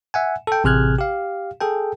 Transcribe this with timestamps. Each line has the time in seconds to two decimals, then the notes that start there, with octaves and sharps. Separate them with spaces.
0.14 E5 F#5 G#5
0.47 A4 G5
0.64 A1 C3 G#4 F6 F#6 G#6
0.98 G4 F5
1.61 G#4 A4 G5